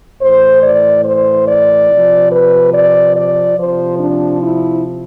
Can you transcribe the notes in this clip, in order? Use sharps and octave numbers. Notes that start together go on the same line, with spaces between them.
A2 E3 C5
D5
C5
D5
C3 F3
B4
D5
D5
C3 F3 C5
D4
E4